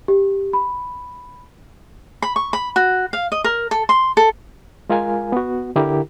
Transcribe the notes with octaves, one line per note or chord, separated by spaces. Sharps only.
G4
B5
B5
C#6
B5
F#4
F5
D#5
A#4
A4
C6
A4
G#3 F4 A#4 F5 G#5
B3 F#4
D3 E4 G4 A#4